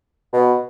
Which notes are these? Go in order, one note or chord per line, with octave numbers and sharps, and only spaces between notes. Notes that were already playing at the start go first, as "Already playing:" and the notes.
B2